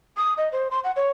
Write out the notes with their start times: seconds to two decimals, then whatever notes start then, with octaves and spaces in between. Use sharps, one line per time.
0.17 D#6
0.37 D#5
0.52 C5
0.71 C6
0.84 F#5
0.96 C#5